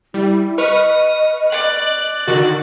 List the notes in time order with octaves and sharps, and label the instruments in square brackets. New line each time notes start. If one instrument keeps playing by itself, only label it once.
[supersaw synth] G3 [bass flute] E4
[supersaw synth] B4 C#6 F6 [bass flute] D#5 [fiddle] D#6
[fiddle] D5 F#6
[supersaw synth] D3 D#3 F#4